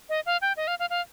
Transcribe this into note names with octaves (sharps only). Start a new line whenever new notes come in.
D#5
F5
G5
D#5
F5
F5
F5